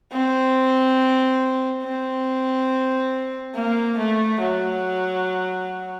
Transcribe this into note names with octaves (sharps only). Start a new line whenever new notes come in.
C4
C4
A#3
A3
F#3